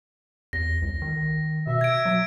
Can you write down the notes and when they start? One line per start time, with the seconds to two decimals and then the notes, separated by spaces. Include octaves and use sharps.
0.53 E2 A#6
0.82 C#2
1.02 D#3
1.67 B2 E5
1.81 G#6 D7
2.06 F#3